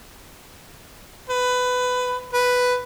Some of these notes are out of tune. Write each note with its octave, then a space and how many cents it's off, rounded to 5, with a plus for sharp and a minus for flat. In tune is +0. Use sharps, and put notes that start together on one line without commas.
B4 +15
B4 +5